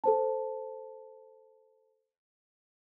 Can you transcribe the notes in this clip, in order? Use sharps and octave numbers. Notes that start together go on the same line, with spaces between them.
A4 C5 A5